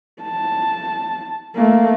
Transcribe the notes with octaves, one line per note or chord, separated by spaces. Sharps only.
A5
A3 A#3